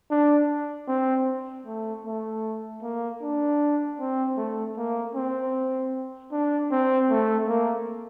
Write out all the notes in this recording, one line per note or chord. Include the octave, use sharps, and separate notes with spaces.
D4
C4
A3
A3
A#3
D4
C4
A3
A#3
C4
D4
C4
A3
A#3